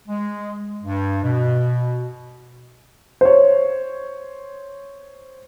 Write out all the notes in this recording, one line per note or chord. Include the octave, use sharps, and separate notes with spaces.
G#3
G2
B2
C5 C#5